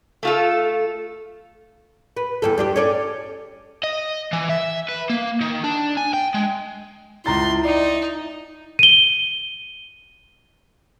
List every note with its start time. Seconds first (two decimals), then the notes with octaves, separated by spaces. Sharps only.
0.23 A3 F4 A4
2.16 B4
2.42 E2 G2 A4
2.58 G2 D4 G4
2.76 C#4 A4 D5
3.84 D#5
4.33 E3
4.49 E5
4.89 B4
5.10 A#3
5.41 D#3
5.64 D4
5.97 G#5
6.13 G5
6.34 G#3
7.26 C#2 E4 A#5 C6 A6
7.64 D#4 D5
8.79 D#7 G7